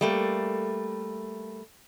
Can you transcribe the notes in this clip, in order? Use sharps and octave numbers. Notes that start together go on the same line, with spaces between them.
G3 A3 A#3